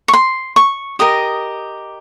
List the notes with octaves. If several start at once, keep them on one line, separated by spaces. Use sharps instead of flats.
C#6
C6
C#6
G4 A#4 D#5 D#6